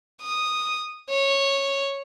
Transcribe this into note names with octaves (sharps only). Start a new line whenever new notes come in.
D#6
C#5